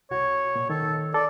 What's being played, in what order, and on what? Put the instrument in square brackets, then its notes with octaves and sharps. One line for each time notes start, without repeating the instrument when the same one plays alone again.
[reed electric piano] C2 C3 F#4 [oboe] C#5
[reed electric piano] A#2
[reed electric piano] D#3 [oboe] A4
[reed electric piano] A4 [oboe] D5